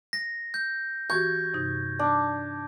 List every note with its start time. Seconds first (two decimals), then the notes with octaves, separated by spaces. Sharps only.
0.13 A#6
0.54 G6
1.10 E3 F#4 G4 C#6 G6 G#6
1.53 G2 C3 D#4
1.99 D4